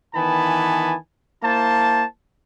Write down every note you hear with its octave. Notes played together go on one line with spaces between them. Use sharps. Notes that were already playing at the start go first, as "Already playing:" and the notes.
D#3 E3 B3 G#5 A5 B5
A#3 E4 C5 A5